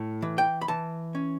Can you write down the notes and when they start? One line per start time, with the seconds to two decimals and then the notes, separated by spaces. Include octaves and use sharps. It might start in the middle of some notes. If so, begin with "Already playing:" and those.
Already playing: A2
0.22 E3
0.38 G5
0.61 B5
0.68 E3 A5
1.15 C#4